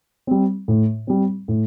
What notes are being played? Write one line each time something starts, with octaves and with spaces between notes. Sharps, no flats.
G3 C4
A2
G3 C4
A2